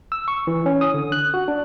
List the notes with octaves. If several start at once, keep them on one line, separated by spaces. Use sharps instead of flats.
E6
C#6
E3
C#4
D#6
D3
F#6
F#4
D4